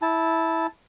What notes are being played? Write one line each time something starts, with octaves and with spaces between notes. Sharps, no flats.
E4 A5